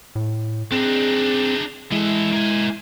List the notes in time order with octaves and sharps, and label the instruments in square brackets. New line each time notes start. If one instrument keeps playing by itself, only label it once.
[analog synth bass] A2
[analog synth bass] C4 [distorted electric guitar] D4 D#4 [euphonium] G#4
[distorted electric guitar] E3 A4 [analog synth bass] G#3 [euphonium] E4
[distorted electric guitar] A#3 G#5